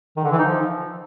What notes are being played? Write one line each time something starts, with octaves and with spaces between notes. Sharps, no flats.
D#3
D3
E3
D#4
F3